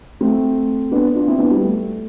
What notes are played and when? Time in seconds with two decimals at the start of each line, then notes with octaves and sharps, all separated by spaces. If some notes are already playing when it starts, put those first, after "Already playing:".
0.21 A3 C4
0.91 B3 D4
1.15 D4 F4
1.27 C4 E4
1.38 B3 D4
1.51 G3 B3
1.63 A3